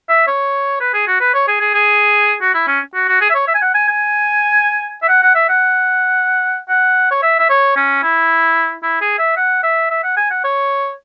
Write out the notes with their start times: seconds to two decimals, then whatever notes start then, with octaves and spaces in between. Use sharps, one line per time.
0.09 E5
0.27 C#5
0.80 B4
0.94 G#4
1.07 F#4
1.21 B4
1.34 C#5
1.48 G#4
1.61 G#4
1.74 G#4
2.41 F#4
2.54 E4
2.68 C#4
2.94 F#4
3.09 F#4
3.21 G#4
3.30 E5
3.35 C#5
3.48 E5
3.55 G#5
3.62 F#5
3.75 G#5
3.88 G#5
5.02 E5
5.08 F#5
5.22 F#5
5.35 E5
5.49 F#5
6.69 F#5
7.11 C#5
7.23 E5
7.39 E5
7.50 C#5
7.77 C#4
8.03 E4
8.83 E4
9.01 G#4
9.19 E5
9.37 F#5
9.63 E5
9.91 E5
10.04 F#5
10.17 G#5
10.31 F#5
10.44 C#5